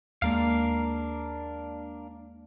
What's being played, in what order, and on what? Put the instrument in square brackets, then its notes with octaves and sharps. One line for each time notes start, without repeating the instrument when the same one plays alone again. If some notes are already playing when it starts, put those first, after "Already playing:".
[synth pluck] D#2 G#3 A#3 [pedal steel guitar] D4 A#4 F5